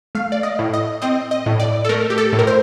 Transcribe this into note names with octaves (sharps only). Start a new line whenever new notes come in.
A3 F5
D5
D#5
A2
D#5
C4 D#5
D#5
A2
D5
A4
A3 A#4
G4
A4
A2
A#4
C5